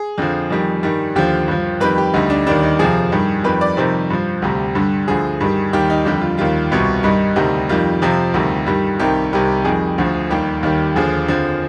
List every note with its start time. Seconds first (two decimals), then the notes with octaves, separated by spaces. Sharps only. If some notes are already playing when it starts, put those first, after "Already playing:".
Already playing: G#4
0.18 F2 D3 F3
0.50 F2 D#3 G3
0.83 G2 D#3 G3
1.15 D#2 D3 F3 G4
1.48 G2 F3
1.80 F2 D#3 G3 B4
1.98 G4
2.14 D2 D3 G3 D#4
2.30 D4
2.47 D#2 D#3 G3 D4
2.63 D#4
2.79 F2 C3 F3 G#4
3.12 G2 D#3 G3
3.44 F2 D#3 G3 B4
3.61 D5
3.77 F2 C3 D#3 G3 C5
4.10 G2 F3
4.42 D2 C3 G3
4.75 G2 D3 G3
5.08 D2 D3 F3 G#4
5.41 G2 D#3 G3
5.73 D#2 D#3 G3 G4
5.90 D#4
6.05 F2 D3 G3 G4
6.21 F4
6.38 D#2 D#3 G3 F4
6.71 C2 B2 G3
7.03 G2 D#3 G3 D#4
7.36 D2 C3 D#3 G3
7.69 F2 D#3 G3 F4
8.02 F2 C3 F3
8.34 D2 C3 D#3 G3
8.67 G2 D#3 G3
8.99 C2 C3 D#3 G3 G4
9.33 C2 C3 D#3 G3
9.65 F2 D#3 G3 G#4
9.98 D2 D3 F3
10.30 D#2 D#3 G3 G4
10.63 D#2 D#3 G3
10.96 D#2 D3 F3 G#4
11.28 F2 D3 F3